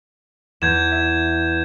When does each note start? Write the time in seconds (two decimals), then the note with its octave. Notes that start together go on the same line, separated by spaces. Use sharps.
0.62 E2 G6 G#6 E7
0.92 E5